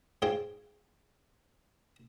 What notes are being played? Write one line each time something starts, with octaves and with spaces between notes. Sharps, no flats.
G#2 F4 G#4 C#5 F5 G5